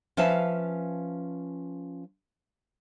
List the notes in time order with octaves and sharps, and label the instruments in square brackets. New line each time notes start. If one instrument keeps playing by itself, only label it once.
[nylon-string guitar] F3 C#4 B4 E5 F5 A5